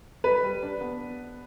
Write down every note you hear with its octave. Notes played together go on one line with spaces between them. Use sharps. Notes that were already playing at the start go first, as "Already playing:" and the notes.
G3 B4
G3
D4
B3